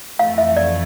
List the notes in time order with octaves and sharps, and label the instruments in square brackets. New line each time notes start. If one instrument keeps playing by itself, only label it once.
[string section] F2 E3 A3 [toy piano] F5
[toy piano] E5
D5